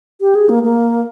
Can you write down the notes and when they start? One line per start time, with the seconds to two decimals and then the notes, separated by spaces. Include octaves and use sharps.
0.21 G4
0.35 G#4
0.49 A#3
0.63 A#3